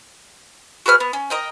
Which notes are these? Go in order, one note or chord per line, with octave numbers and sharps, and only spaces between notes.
F#4 G#4 B4 F6
B3
C#4
A#4 D#5 G5